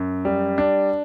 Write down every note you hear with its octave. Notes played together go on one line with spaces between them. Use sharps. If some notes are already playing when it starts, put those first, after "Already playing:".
Already playing: F#2
G3
D4